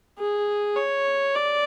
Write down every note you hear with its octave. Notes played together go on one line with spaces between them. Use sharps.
G#4
C#5
D5